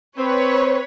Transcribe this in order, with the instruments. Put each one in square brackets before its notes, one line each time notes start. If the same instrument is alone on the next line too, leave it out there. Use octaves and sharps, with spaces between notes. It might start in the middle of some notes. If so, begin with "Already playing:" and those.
[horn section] C4 [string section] B4 C#5